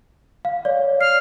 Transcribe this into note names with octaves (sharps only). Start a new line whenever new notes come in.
F5
C#5 D5
F6 C7